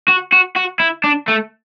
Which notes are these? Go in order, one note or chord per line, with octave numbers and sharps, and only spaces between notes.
F#4
F#4
F#4
E4
D4
A3